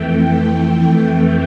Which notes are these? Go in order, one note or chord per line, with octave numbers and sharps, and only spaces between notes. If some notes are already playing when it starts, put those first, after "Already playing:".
Already playing: F2 E3 A3 G5
G5